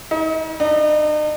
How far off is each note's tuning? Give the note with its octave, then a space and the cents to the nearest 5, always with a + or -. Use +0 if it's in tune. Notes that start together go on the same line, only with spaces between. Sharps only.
D#4 +40
D#4 -45